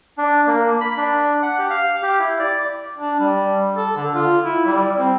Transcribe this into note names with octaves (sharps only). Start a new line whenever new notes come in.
D4
A#3
B5
D4
F#5
G4
F5
G4
E4
D5
D4
G3
A4
D3
F4
E4
G3
C4